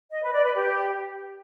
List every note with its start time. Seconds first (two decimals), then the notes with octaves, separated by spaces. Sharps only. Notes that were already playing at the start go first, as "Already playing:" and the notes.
0.11 D#5
0.22 B4
0.33 D5
0.44 B4
0.55 G4